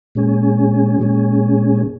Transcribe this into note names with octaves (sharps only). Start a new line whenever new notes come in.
A#2 G#3 C#4 G#4
A#2 G#3 C#4 G#4